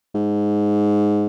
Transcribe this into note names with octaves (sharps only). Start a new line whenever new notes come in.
G#2